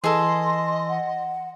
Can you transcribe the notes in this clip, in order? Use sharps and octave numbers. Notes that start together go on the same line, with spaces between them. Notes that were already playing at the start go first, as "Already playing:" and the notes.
E3 G#4 A4 D#5 C6
F#5